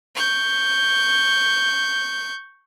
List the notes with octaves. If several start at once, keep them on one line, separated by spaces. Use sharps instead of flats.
C#6 G6